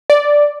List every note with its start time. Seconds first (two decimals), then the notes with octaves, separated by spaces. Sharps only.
0.10 D5